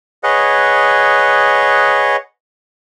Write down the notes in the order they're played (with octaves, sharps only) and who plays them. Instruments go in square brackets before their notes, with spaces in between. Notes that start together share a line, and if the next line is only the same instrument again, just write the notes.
[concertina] G#4 B4 C#5 D#5 F#5